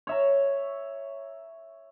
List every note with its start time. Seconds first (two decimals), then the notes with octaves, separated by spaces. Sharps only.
0.07 C#5 E5 A#5